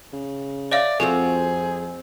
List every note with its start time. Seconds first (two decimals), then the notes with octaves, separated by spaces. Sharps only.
0.13 C#3
0.72 C#5 D5 E5 F5
1.00 F2 C4 F4 F#4 G#4 A4